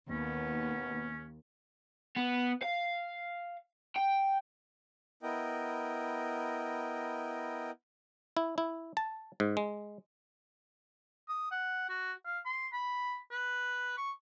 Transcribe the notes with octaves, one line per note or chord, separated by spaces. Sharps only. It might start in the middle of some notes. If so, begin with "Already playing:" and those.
D#2 B2 B3 C#4
B3
F5
G5
B3 E4 A#4 D#5 G5
E4
E4
A5
G#2
G#3
D#6
F#5
F#4
F5
C6
B5
B4
C#6